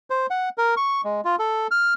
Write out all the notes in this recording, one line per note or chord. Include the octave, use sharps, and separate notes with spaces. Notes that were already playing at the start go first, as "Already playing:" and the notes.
C5
F#5
A#4
C#6
G#3
F4
A4
F6